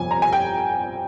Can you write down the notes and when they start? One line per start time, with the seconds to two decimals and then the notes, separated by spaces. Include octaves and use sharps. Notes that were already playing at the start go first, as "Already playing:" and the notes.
Already playing: G1 F2 C3 F3 G#5
0.11 A#5
0.22 G#5
0.33 G5